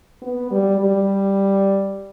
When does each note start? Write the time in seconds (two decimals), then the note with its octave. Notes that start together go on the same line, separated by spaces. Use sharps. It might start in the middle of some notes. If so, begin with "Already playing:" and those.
0.22 B3
0.51 G3
0.80 G3